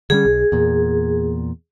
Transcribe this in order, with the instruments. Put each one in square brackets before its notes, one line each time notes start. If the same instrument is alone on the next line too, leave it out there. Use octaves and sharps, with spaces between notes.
[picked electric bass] D3 G3 C#4 [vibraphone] G#4
[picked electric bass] B1
E2 A#2